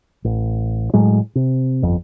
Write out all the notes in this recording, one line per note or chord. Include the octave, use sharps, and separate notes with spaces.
A1
A2 F#3 G#3
C3
G1 F2